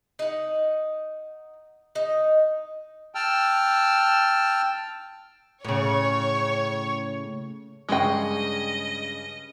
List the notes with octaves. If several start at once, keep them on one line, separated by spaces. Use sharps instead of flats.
D#4 F#5
D#4
G5 A5 E6 F6
A2 C#3 C#5 C#6
G2 C#3 G#3 D#5 G5 C#6